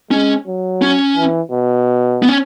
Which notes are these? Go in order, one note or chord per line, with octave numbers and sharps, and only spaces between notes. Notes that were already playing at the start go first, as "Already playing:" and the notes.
G#3 C#4
F#3
C#4
E3
B2
B3
C#4